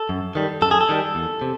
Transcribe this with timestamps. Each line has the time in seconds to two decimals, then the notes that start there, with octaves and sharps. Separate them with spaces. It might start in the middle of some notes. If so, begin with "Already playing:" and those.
Already playing: A4
0.09 F#2
0.35 D#3 G3
0.62 F#2 A4
0.71 G#4
0.81 A4
0.89 D#3 G3
1.15 E2
1.41 C3